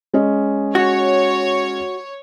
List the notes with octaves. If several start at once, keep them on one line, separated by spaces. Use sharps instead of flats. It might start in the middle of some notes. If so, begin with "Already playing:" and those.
G#3 C#4 D#5
F#4 C#5